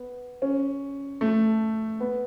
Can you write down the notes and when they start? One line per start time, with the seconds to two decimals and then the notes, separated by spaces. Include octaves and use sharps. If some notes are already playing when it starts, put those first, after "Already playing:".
Already playing: B3
0.42 C#4
1.21 A3
2.00 B3